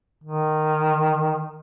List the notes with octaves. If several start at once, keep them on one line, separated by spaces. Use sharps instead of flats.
D#3